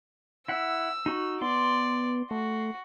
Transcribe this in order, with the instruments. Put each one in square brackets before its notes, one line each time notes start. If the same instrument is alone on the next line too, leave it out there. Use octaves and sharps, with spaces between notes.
[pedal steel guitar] E4 F#5 [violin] E6
[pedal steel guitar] D#4 F#4
[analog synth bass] B3 [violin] D5 [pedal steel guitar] C6
[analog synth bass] A3 [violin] F#4